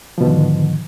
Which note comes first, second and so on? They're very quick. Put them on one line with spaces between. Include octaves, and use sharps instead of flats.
F3 B2 D#3 G#2 D3